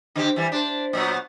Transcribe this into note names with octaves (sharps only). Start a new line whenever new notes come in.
D3 C4 G4
E3 G3
D4 C5
A#2 F#3 B3